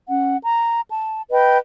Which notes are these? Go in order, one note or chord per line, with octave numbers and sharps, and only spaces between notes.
C#4 F#5
A#5
A5
B4 D#5 G5